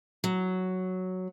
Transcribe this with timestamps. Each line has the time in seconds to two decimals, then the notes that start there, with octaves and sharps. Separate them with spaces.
0.24 F#3